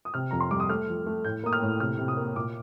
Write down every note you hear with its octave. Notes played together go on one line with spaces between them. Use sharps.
D#6
C3 F6
F2 A#5
C6
G3 D6
D#6
A3 F6
F3
A3
A2 G6
A#3 D#6
F6
A2
C3 F6
C3
D#6
A#3
A#2 D6